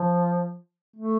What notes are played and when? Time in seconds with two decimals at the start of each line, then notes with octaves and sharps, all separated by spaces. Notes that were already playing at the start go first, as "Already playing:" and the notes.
Already playing: F3
0.96 A3